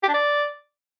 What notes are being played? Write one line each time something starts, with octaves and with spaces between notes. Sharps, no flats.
G4
D4
D5